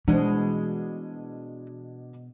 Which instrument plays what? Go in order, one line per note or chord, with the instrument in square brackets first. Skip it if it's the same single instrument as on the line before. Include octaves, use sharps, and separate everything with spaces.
[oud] B2 G#3 [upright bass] E3 [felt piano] D4 C5